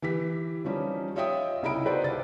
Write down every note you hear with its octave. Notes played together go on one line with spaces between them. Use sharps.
E3 G4 B6
F3 G3 C#4 D#4
F4 C#5 D#5 E5 G5 D#6
C2 C#3 D#4 E4 B5 D7
D#4 F#4 B4 C5 D5
C2 C3 A6